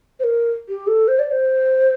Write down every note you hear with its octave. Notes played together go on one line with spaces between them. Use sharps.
C5
A#4
G4
A4
C5
D5
C5